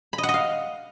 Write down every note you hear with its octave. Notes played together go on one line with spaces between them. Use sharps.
B5
D#5
F#5
D#5
F5